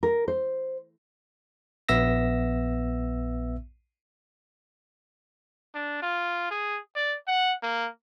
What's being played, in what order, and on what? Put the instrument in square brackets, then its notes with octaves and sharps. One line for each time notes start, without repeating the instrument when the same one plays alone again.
[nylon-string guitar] A#4
C5
[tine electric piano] A#1 B3 E5 E6 A#6
[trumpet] D4
F4
G#4
D5
F#5
A#3